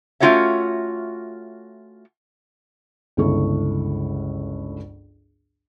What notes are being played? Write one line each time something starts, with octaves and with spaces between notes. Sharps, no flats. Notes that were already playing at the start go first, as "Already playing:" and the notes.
A3 C#4 F4 F#4 C#5 E5
G1 C#2 C#3 E4 A4 C#6